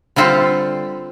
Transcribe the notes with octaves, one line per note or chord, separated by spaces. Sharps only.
D3 G3 C4 F4 A4